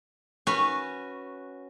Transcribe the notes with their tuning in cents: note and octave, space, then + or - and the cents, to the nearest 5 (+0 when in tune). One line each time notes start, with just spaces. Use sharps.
C#4 -10 F#4 +0 B4 -5